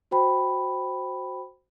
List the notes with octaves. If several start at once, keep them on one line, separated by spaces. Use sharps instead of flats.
F#4 C5 G5 B5